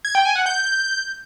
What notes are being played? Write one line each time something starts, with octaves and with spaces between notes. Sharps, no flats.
G#6
G5
G#5
F#5
G6